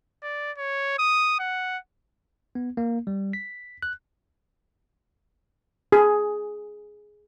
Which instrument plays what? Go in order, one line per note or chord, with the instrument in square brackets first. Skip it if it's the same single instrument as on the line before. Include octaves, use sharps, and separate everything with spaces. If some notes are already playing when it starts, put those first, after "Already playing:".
[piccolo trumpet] D5
C#5
D#6
F#5
[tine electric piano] B3
A#3
G3
B6
F#6
[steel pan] G#4